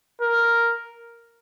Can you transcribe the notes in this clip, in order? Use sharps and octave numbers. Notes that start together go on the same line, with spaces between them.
A#4